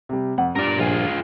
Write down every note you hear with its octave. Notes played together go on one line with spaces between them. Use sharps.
C3 G3
F2 F#5
G2 A#4 D5
A#1 F4 G#4